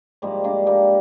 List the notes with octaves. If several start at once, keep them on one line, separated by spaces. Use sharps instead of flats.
G#2 F3 G3 A#3
A#3 D4
G3 A#3